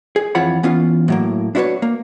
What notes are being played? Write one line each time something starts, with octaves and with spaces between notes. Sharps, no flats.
G#4
F2 E3 F4 C#5 F#5 B5
E3 B3 C#4 F4
A2 F#3 A#3
D4 E4 F#4 G#4 B4 C#5
A#3